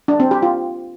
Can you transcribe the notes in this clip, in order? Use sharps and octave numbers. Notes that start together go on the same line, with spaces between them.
D4
C4
G4
F4